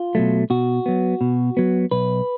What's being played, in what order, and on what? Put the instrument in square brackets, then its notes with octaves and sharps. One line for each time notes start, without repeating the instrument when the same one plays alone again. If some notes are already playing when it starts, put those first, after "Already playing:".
Already playing: [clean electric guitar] F4
B2 F#3 A3
B2 F#4
F#3 B3
B2
F#3 B3
B1 B4